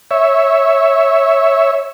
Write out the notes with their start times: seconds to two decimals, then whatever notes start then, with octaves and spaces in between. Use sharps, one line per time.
0.11 C#5 E5